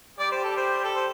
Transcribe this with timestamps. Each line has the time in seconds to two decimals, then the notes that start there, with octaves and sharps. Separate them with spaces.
0.19 G3 G4 D5
0.31 C5
0.44 A4
0.57 C5
0.84 A4
0.95 C5